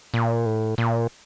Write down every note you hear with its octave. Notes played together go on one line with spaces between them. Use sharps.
A#2
A2
A#2